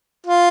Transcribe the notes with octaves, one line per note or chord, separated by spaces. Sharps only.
F4